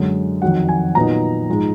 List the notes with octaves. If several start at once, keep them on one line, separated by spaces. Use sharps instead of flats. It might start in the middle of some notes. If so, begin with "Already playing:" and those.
Already playing: F#2 D3 G#3 D#5
F2 D#3 F#3 F#5
G#5
A#2 F#3 B3 D#4 A#5
G#2 F3 G#3 D#4